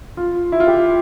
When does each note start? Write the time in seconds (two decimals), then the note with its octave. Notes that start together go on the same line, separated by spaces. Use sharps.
0.17 F4
0.52 E4
0.60 F4
0.67 G4